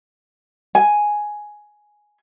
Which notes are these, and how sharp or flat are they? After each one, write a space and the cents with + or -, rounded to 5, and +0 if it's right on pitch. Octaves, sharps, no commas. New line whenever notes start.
G#5 +5